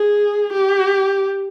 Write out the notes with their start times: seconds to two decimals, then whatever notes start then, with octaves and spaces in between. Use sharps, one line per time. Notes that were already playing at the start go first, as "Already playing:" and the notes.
Already playing: G#4
0.53 G4